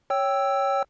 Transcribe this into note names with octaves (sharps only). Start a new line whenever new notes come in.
C#5 G5 E6